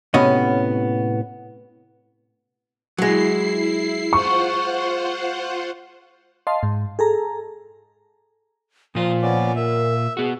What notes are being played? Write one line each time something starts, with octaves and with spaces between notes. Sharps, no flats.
A2 C3 B3 C#4 F#4 D#5
F#3 G#3 E4 C7
F4 C5 F#5 C#6
D#5 F5 A5 C6
G#2
G#4 A4 A#5
A#2 F3 F4 D#6
B3 C#4 D5
A#4 E5
B3 F#4 G#4